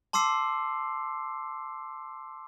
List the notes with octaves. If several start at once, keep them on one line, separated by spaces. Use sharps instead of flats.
A5 C6 D6 E6 C7